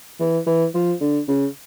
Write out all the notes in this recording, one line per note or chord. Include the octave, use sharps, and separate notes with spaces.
E3
E3
F3
D3
C#3